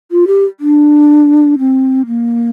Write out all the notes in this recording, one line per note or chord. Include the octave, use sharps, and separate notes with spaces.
F4
G4
D4
C4
A#3